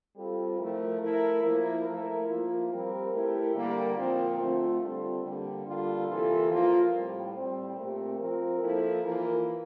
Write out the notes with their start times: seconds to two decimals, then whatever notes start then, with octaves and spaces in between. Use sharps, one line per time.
0.16 G3 C4 F4 A4
0.58 F3 A3 E4 A#4
1.00 A3 E4 A#4
1.42 F3 A#3 E4
1.85 A3 E4 A#4
2.27 F3 A#3 F4
2.69 G3 C4 G4 A#4
3.11 A3 E4 G4 A#4
3.54 D3 G3 A#3
3.96 A#2 F3 C4 F4 A#4
4.38 D3 A3 C4 F4
4.80 D3 G3 C4 F4 A4
5.23 D3 G3 A#3
5.65 D3 G3 A#3 F4 A4
6.07 C3 E3 A#3 F4 A4
6.49 F3 A#3 F4
6.91 A2 G3 C4
7.34 A2 G3 C4
7.76 A#2 A3 C4 G4 A#4
8.18 F3 C4 F4 A#4
8.61 F3 A#3 E4 A4
9.03 E3 A#3 F4 A#4